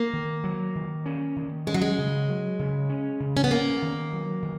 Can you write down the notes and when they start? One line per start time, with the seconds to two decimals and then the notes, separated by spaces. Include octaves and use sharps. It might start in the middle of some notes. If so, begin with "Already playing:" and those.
Already playing: A#3
0.13 D#3
0.44 F#3
0.75 D#3
1.06 C#4
1.36 D#3
1.67 G#3 C#4
1.74 F#3
1.82 G#3
1.98 C#3
2.29 F#3
2.59 C#3
2.90 C#4
3.20 C#3
3.37 C#4
3.44 B3
3.51 A#3 C#4
3.82 D#3
4.13 F#3
4.43 D#3